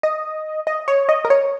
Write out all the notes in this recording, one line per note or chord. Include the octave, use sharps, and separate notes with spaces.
D#5
D#5
C#5
D#5
A#4
C#5